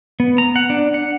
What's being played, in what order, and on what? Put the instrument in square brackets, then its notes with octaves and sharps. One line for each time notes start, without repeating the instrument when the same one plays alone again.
[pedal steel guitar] B3
A#5
F#5
D4
F#5